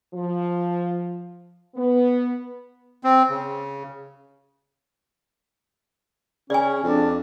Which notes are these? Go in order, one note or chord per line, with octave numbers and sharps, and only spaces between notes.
F3
B3
C4
C#3
C#3 C#4 D5 G#5
F2 D4